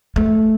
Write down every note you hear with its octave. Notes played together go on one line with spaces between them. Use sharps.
A3